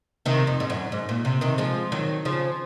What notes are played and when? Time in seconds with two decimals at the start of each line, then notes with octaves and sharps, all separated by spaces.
0.26 C3 D#3
0.47 F2
0.60 G#2
0.70 F#2
0.92 G#2
1.09 A#2
1.25 C3
1.41 C3 D#3
1.58 F3 G#3
1.92 D#3 F#3
2.25 C#3 F3